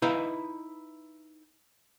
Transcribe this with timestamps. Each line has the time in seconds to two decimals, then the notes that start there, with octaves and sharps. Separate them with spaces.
0.02 D#4 E4 B4 D#5 F5 A#5